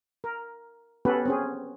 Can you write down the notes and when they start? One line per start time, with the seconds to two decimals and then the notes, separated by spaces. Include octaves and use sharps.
0.24 A#4
1.05 B3 C#4 F#4 G4 A4 B4
1.26 C4 C#4 G#4